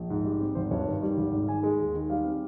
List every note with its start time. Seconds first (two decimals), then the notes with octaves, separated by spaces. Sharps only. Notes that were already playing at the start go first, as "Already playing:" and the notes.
Already playing: A#1
0.10 G#2
0.25 G3
0.40 C4
0.55 G#1 C5
0.71 G2 C#5
0.87 D#3
1.02 G3
1.17 G#1
1.32 G#2
1.48 D#3 G#5
1.63 G#3
1.79 D#2
1.94 D#3
2.10 G3 F5
2.25 C4